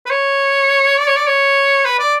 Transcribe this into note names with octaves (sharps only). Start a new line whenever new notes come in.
B4
C#5
D5
C#5
D5
C#5
B4
D5